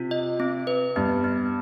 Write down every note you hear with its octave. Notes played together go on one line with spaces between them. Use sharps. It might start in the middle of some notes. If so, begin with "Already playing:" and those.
Already playing: C3 F4
D#5
C4
B4
G2 B3
B3